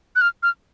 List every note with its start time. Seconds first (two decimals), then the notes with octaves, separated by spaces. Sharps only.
0.16 F#6
0.21 F6
0.43 F6